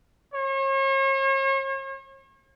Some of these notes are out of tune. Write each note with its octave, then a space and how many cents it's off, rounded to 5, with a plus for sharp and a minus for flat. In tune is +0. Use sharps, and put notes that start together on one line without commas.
C#5 -40